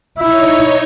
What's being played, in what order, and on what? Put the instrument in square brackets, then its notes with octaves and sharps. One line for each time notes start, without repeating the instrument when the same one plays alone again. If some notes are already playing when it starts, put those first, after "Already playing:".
[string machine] D#4 C#5 [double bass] E4